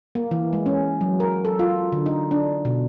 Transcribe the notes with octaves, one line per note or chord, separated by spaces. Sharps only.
A#3
E3
G#3
C#4
F#3
A#4
A4
F4
D3
D#4
D4
B2